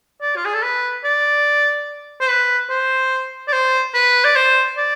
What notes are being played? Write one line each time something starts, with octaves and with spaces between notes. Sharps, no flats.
D5
F4
G#4
A4
B4
D5
C5
B4
C5
D5
C5
B4
D5
C5
D5